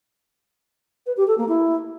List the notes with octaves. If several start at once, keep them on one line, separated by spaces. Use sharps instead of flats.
B4
G4
A4
A#3
E4